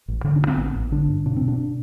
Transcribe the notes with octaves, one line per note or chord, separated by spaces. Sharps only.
A1
D3
D4
G2
C4
A1 B3
A1
D3 D4
G2
B2 D4
C4
B2
D4